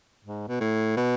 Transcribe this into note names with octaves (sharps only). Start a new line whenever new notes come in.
G#2
B2
A2
B2